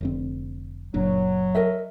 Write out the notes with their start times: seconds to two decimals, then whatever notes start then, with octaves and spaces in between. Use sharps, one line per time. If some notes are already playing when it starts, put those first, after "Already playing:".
0.01 F1 D3 C4
0.94 F#1 A#2 F#3 D4
1.55 A#4 D#5 E5